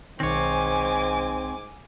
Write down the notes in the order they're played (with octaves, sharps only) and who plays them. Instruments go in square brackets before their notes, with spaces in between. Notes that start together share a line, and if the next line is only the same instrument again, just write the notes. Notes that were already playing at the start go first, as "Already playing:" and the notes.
[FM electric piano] B1 D#3 [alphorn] G#2 [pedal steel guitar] C4 C#5 [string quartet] G#5 D6